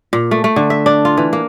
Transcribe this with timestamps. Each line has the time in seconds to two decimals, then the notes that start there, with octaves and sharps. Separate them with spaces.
0.13 A#2
0.31 A3
0.44 A3
0.56 D3
0.70 E5
0.86 D4
1.05 F4
1.17 E3
1.33 A#3